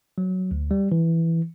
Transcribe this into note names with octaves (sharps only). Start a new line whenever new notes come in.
F#3
D2
G3
E3